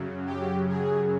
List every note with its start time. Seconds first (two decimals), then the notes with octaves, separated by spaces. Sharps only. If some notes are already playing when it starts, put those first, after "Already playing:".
Already playing: F#2 C#3 F#3
0.26 G4
0.69 G#4